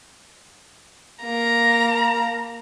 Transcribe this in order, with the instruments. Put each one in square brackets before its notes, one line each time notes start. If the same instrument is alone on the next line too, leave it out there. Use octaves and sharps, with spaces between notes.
[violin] A#3 A#5